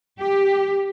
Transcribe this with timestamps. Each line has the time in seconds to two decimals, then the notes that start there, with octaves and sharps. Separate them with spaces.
0.20 G4